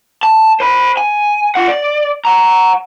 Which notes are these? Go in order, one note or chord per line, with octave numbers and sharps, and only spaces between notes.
A5
C5 B5
G#5
F4 F#5
D5
F#5 A#5